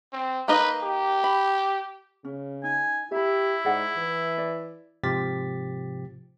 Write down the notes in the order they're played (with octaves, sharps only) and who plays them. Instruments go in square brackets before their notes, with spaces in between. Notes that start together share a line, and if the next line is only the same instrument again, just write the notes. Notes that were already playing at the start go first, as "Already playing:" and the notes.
[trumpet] C4
[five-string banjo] A#3 D#4 D#5 [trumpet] B4
[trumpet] G4
[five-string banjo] B5
[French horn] C#3 [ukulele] C#4
[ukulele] D#4 [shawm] G#5
[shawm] E4 [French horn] G4 [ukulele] E5 B5
[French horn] G#2 [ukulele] G#4 D5 F#5
[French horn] E3
[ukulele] D5
[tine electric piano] G#2 C3 F3 G4 A6 B6